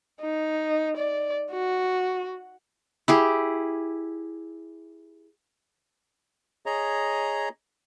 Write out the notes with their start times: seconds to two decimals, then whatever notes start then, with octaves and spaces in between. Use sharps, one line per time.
0.20 D#4
0.97 D5
1.53 F#4
3.08 E4 G4 G#4
6.66 G#4 C#5 D#5 A#5